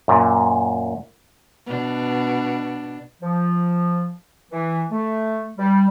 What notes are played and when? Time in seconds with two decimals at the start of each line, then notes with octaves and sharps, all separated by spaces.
0.08 F#2 A#2
1.66 B2 D4
3.22 F3
4.52 E3
4.92 A3
5.58 G3